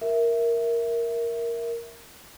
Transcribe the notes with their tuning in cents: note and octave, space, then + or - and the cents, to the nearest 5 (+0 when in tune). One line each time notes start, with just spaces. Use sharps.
A#4 +0 E5 +0